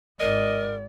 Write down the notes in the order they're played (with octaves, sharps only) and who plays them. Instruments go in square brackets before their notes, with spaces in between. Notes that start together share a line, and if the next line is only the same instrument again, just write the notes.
[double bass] G#1 G#2 [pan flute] A#4 [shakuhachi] D5 [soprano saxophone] D#5